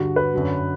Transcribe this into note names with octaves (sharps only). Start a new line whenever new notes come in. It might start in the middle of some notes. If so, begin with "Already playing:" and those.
Already playing: G2 D3 G3 F#4
B4
F#2 D3 F#3